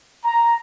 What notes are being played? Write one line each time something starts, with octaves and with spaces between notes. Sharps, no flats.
A#5